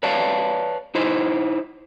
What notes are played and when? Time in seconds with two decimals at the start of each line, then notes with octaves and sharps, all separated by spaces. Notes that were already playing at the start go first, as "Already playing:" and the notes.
0.03 B4 C#5 D5 F5 A5
0.95 D#4 E4 C5